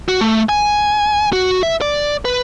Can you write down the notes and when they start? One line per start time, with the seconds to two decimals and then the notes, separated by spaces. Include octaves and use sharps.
0.08 F#4
0.21 A3
0.49 G#5
1.33 F#4
1.63 E5
1.81 D5
2.25 B4